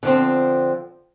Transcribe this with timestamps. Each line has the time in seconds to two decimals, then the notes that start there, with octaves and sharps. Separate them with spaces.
0.03 D3 F3 C4